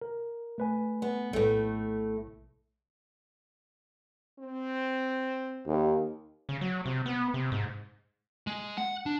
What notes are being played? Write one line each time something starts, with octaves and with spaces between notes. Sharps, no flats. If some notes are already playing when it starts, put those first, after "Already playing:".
A#4
A3 B4 G#5
B3
A#1 A2 A3
C4
D#2
C#3
F#3
C3
B3
C3
G#2
G#3
F#5
D4